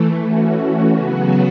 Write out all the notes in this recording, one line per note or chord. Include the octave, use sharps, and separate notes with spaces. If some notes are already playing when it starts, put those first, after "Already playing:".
Already playing: E3 A3
E3 A3 C#4 F#4
C#3 F#3 B3 F#4